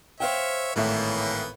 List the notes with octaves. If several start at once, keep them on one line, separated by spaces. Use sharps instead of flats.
C5 C#5 E5 F5 G5
G#1 A2 E3 A#3 B3 A4 C#5 E5